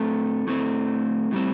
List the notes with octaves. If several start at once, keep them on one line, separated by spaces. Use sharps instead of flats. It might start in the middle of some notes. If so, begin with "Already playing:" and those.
Already playing: A2 A3 C4 A4
A2 A3 C4
A2 G3 C4